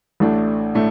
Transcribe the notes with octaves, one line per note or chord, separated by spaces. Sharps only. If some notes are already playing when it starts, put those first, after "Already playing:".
A1 A2 A3 D4
A2 A3 D4